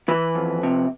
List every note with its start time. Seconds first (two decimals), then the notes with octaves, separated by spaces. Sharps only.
0.08 E3 B4
0.35 F2
0.63 C3